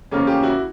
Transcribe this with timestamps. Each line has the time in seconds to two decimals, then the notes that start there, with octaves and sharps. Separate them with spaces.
0.11 E2 C#3 F3 A#3 C#4 F4
0.27 F4 G4
0.42 E4 F#4